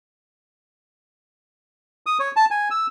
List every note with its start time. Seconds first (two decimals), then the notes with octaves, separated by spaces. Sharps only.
2.06 D#6
2.19 C#5
2.36 A5
2.51 G#5
2.71 E6